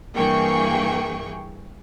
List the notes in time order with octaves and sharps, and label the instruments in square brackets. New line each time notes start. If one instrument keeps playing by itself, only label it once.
[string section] G2 E3 A#3 G#4 G5 C#6